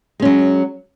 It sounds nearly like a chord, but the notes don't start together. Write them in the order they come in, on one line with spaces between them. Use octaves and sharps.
G#3 C#4 F#3